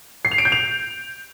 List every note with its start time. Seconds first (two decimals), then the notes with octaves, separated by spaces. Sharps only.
0.25 C7
0.31 F7
0.38 D7
0.45 G6
0.52 F7